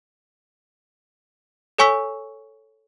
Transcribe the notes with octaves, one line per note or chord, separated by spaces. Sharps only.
A4 C#5 G#5 C#6 E6 B6